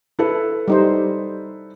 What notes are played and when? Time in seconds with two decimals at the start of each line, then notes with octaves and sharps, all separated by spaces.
0.19 E4 A4 B4
0.68 G3 D#4 C5